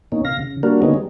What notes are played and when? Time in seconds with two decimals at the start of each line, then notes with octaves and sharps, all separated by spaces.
0.12 B2 A#3 C#4 D#4
0.25 C3 F5 A#6
0.39 C#3
0.63 G3 A#3 D4 F#4 A#4
0.82 D3 G#3 A#3 B3 C#4 D#4
0.94 G3